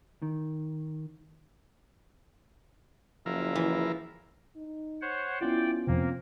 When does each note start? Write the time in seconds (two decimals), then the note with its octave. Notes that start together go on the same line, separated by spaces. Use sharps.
0.22 D#3
3.26 F#1 F3 E4 A#4
3.56 E3
4.56 D#4
5.01 C5 C#5 F#5
5.41 B3 C#4 E4 F4 D5 G5
5.87 F2 C3 A#3 C4